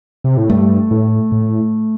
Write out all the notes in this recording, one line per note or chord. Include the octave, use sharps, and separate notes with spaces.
C3
A2
G2 A3
A2
A2